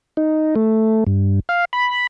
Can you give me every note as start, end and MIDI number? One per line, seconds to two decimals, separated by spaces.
0.17 0.55 63
0.56 1.04 57
1.07 1.40 43
1.49 1.65 77
1.73 2.07 83